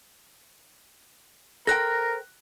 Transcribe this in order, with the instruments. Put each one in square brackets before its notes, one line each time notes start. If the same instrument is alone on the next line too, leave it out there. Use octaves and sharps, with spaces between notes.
[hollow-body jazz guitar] A4 C5 G5 [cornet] A#4 [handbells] F#6 A#6